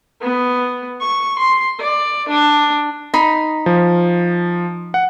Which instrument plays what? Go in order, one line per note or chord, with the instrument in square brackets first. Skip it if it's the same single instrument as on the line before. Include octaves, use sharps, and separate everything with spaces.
[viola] B3
C#6
C6
D5
D4
[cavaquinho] D#4 B5 C6
[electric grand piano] F3
F#5